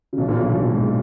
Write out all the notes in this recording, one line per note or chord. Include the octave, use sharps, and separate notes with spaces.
C#3
B1 B2
A#1 A#2
B1 B2
B1 B2
A#1 A#2
G#2